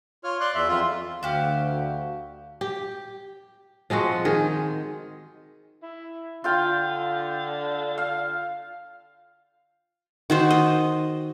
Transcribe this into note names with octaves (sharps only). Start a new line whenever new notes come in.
F4 C#5 F6
D5 C6 F#6
E2 E5
F2 F4
D2 F#4 G4 F5 F6
G4
F3 G#3 C4 F#4
D#3 G#4
E4
D3 F4 F5 G5
F5
D#3 F#4 C5
D#5